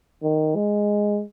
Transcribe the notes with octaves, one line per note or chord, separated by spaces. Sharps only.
D#3
G#3